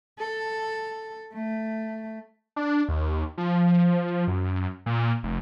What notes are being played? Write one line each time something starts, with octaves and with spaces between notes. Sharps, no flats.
A4
A3
D4
D#2
F3
F#2
A#2
F1